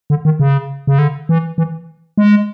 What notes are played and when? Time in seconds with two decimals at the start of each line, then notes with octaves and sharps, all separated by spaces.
0.10 D3
0.25 D#3
0.40 C#3
0.87 C#3
0.99 D3
1.29 E3
1.58 E3
2.18 G#3